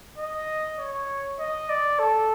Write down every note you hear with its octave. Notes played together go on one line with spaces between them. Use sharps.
D#5
C#5
D#5
D5
A4